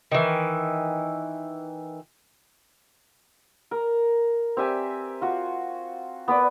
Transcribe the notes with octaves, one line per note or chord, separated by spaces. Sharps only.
D#3 E3
A#4
C4 G4 E5 G#5
F4 F#4
B3 B4 D5